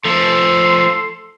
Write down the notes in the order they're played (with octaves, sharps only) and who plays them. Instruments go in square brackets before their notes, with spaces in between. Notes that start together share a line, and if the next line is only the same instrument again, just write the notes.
[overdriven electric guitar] F3 A3 [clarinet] A4 [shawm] C6